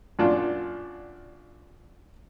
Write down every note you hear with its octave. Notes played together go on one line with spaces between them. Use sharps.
F#2 A#2 D4 F4